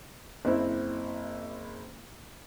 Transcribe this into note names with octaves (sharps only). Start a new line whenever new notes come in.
F#1 C4 E4